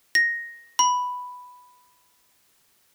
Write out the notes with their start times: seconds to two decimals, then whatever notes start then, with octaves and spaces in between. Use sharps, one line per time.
0.15 A#6
0.79 B5